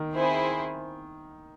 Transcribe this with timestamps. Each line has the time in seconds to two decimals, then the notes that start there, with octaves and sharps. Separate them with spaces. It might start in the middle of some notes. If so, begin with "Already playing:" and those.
Already playing: D#3
0.13 C4 E4 G#4 C5